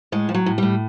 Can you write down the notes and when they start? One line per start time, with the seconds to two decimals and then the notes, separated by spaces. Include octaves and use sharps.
0.12 A2 G#3
0.29 F3
0.34 F#3
0.46 A2
0.58 A2 G3